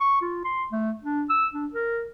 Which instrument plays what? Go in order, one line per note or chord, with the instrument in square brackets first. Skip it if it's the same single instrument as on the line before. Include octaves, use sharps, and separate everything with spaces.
[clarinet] C#6
F4
C6
A3
D4
E6
D4
A#4